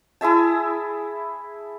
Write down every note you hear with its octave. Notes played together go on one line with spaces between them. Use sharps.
E4 G#4 E5 A5